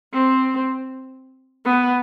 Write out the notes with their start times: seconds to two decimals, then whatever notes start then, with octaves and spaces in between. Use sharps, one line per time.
0.13 C4
1.65 B3